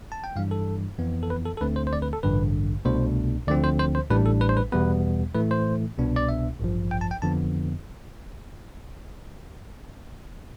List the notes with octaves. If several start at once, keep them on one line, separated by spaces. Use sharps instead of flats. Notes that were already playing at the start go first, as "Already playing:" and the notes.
A5
G5
G2 E3 G3 D4 F5
A4
F2 E3 B3
A4
B4
A4
A4
D2 D3 A3 C4 B4
C5
C5
D5
B4
A4
A1 G2 D3 B4
C2 B2 A3 D4 C5
D2 D3 F3 C4 D5
C5
C5
C5
A1 A2 G3 D4 B4
A4
B4
C5
B4
E2 B2 G3 B3 B4
A2 E3 A3 B4
C5
C2 B2 B3 D4
D5
E5
A1 G2 F3
G5
A5
G5
F2 D3 F3 B3 A5